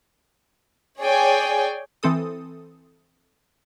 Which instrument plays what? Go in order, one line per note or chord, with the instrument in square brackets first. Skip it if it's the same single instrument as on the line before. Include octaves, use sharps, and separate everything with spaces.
[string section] G#4 C#5 D5 G5 G#5
[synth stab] E3 C4 A4 D#6